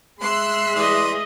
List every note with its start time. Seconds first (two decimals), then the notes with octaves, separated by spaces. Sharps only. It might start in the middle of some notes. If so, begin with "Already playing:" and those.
0.21 G#3 E5 C6 E6 F#6 C7
0.75 E3 G#4 D5 D#5 C6